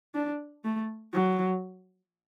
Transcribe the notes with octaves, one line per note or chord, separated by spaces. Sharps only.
D4
A3
F#3